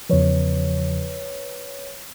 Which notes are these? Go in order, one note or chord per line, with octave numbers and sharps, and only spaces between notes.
E2 C#3 F3 B4 C#5